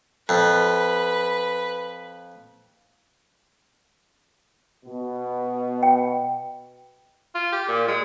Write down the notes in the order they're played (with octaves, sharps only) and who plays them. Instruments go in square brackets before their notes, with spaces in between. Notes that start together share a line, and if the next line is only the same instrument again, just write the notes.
[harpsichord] F2 [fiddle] B4
[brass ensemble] B2
[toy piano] G5
[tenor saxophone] F4
G4
A#2
G#3